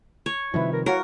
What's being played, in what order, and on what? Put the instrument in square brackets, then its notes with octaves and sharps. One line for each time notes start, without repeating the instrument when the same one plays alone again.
[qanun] C#5
[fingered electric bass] C3 D#3 F3 [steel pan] G3 B4 [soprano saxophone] E4
[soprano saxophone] A#4
[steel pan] E4 F#4 F5 [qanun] A#4 [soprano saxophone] C#5